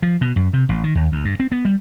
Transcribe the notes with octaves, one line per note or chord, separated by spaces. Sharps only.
F3
B2
F#2
C3
A1
D#3
D#2
D2
G2
C4
B3
G3